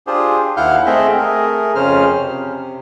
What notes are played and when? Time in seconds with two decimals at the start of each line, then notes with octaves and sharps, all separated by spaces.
0.07 D4 F4 G4 G#4 C5
0.57 D#2 E4 F5 F#5 F6 G6
0.86 A3 C4 G#4 D#5 E5
1.18 A3 G#4 A#4
1.75 F2 C#3 C#4 C5 F6
2.18 C3